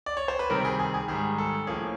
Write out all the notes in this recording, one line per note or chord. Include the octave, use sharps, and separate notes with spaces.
D5
C#5
C5
B4
C3 D#3 G3 C4 A#4
G#4
G#4
G#4
G#2 D#3 G3 G#4
A4
A2 F3 A#3 C#4 G#4